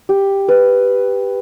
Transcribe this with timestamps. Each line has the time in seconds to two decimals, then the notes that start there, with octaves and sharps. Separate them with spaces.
0.09 G4
0.49 B4